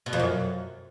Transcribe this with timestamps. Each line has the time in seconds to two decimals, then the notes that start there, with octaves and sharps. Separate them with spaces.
0.06 B2
0.13 F2
0.19 F#2